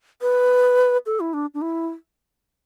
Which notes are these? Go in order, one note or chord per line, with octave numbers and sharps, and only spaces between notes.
B4
A4
E4
D4
D4
E4